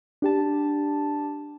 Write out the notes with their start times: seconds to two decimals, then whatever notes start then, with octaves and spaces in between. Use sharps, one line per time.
0.22 D4 G4 A5